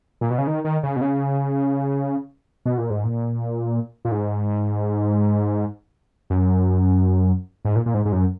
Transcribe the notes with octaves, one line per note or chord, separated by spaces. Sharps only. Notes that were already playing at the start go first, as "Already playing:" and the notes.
A#2
B2
C#3
D#3
D#3
C#3
B2
C#3
B2
A#2
G#2
A#2
A#2
G#2
F#2
G#2
A#2
A#2
G#2
G#2
F#2